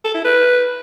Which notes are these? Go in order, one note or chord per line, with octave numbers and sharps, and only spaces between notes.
A4
E4
B4